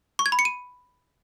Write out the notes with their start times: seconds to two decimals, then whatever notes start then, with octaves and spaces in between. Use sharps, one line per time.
0.19 C#6
0.26 G#6
0.32 B5
0.39 C#7
0.45 D#7